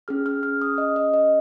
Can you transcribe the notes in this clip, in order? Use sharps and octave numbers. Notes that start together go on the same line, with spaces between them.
C#4 G#4 F6
F6
F6
D#6
D#5
D#5
D#5